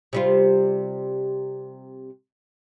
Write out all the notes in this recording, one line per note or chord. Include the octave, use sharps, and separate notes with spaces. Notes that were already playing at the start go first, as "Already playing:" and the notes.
C3 G3 F4